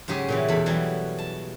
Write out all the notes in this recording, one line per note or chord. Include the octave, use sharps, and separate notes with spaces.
G#2 C#3 F#3 G4 G#4
A#2 C#3 E3
E2 B2 A4 B5
E3 F#3 G3
A5